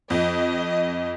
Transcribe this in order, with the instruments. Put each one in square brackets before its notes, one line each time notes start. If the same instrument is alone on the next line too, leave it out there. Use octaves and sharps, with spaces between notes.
[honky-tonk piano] F2 [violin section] D#5